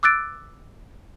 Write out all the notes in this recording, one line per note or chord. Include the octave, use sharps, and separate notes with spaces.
D6 E6 F#6 A6 D7